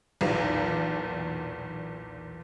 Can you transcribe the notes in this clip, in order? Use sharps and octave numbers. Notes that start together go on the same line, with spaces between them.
B1 E2 A#2